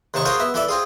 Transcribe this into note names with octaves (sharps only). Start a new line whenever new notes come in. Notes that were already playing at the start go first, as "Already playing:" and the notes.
D#2 C3 D#3 A5 C#6
F4 F#4 G#4 A#4 C5 C#5
B3 E5
E3 E4 A4 D5 E5
C4 F4 G#4